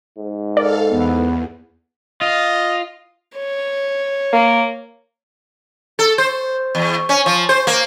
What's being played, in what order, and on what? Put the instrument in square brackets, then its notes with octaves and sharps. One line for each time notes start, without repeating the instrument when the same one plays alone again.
[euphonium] G#2
[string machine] A4 F5 [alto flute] A#4 [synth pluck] D5
[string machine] E2 [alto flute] B3
[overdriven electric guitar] F4 [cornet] D#5
[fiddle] C#5
[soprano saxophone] A#3
[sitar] A4
C5
E2
C#4
F3
C5
A#3